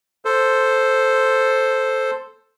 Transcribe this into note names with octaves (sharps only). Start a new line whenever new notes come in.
A4 C5